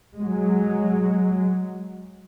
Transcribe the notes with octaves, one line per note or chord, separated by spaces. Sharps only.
F#3 G#3